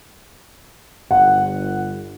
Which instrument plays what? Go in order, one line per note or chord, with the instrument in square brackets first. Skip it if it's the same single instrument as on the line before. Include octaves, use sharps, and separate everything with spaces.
[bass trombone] G1 [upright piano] F#5